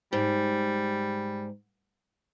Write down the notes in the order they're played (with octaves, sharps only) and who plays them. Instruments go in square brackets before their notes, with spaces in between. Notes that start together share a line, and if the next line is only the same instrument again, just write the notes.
[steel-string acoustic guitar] G#2 [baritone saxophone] G3